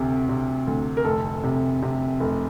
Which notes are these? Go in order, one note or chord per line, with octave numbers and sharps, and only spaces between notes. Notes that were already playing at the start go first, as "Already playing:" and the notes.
Already playing: D2 C3
C3
D2
A#4
F1 A4
C3
C3
F1